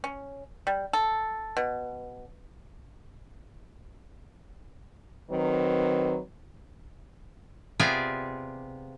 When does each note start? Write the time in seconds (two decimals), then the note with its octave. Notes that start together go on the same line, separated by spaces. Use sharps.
0.04 C#4
0.67 G3
0.93 A4
1.57 B2
5.31 D#3 F#3 C4 B4
7.80 C3 B3 F4 G4 G#4 D5